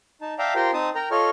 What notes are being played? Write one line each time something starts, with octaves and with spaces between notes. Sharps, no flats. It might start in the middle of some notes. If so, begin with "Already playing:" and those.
D#4 A5
D5 E5 F5 G5 A5 A#5
F4 G4 A#4 C5 G5
C4 D#4 A5 D#6
A#4 G5 A#5
F4 A4 C#5 D#5 C#6 F6